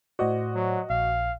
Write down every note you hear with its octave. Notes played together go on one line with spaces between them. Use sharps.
A2 F#4 C5 D5 D#5 F#5
F#3
A#1 F5